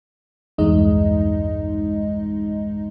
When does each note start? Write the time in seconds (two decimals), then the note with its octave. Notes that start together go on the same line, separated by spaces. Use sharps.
0.58 B1 E2 G2 G#3 D#4 D#5